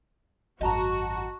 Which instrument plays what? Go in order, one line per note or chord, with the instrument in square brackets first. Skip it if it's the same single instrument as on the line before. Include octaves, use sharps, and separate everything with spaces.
[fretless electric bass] G#1 F#2 [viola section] F#4 [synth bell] D#5 A5 A#5